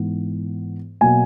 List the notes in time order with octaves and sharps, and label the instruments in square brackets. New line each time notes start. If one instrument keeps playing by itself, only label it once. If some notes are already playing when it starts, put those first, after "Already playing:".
Already playing: [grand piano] G#2 E3 B3
B2 F#3 A#3 G#5